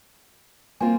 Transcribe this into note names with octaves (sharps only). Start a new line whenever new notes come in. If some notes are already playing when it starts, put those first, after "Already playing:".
A#3 C4 F4 G#5